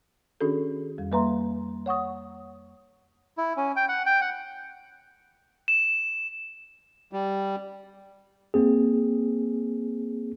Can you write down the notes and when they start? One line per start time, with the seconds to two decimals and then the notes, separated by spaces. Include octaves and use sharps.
0.41 D#3 C#4 D4 F#4 G#4 A4
0.98 F2 G3
1.12 G3 A#3 B4 E5 A#5 C6
1.86 C#5 F#5 C#6 D#6
3.38 E4
3.57 C#4
3.76 G5
3.89 F#5
4.06 G5
4.21 F#5
5.68 E7
7.13 G3
8.54 A#3 C4 G#4